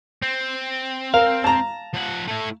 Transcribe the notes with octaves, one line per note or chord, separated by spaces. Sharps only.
C4
A#4 F5
A5 A#5
F3 F#5
A3 E4